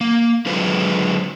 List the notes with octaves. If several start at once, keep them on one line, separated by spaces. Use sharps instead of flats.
A#3
D3 F#3 G#3 F4 B4 C5